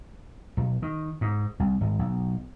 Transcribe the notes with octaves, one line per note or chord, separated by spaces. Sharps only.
B1
D#3
G#2
C2
G#1
B1